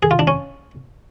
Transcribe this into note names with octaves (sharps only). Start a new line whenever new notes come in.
G#4
F4
D4
C#4